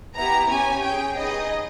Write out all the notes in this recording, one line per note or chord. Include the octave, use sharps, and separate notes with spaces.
B3 E4 G4 A#5
C#4 G4 G#5
C#4 G#4 G5
B3 D#4 G#4 D#5